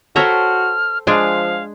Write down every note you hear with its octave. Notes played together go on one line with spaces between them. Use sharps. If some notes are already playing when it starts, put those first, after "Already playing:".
F#4 A4 C5 C#5 E5 G5 A#5 F6
F3 G#3 D4 G#4 F5 G#5